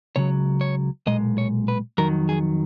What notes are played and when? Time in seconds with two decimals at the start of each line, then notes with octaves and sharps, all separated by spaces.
0.16 C#2 C#3 F#3 C#5
0.61 C#5
1.07 B1 A#2 G#3 D#5
1.38 C#5
1.68 B4
1.98 F2 D#3 F#3 A#4
2.29 G#4